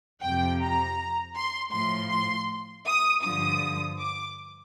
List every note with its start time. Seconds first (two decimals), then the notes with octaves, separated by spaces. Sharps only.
0.22 F2 C3 F3 G5
0.61 A#5
1.35 C6
1.73 A2 F3 C6
2.11 C6
2.86 D#6
3.24 G2 D3 F3 D#6
3.99 D6